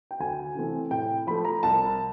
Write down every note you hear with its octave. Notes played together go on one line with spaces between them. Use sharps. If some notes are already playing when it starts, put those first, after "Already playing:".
G5
D2 G#5
C3 E3 A3 C4
A2 G5
F3 A3 B5
A#5
C2 A5